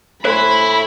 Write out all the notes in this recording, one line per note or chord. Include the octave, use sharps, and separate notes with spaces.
A2 E4 C5 G#5 B5 C6